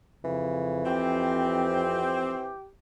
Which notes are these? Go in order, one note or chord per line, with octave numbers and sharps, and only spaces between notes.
F2 C#3 E3
C4 G4